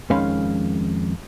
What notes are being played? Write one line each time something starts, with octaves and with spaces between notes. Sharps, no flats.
F2 D#3 G#3 C#4 F5 B5